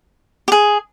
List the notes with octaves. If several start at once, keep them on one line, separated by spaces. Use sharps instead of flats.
G4
G#4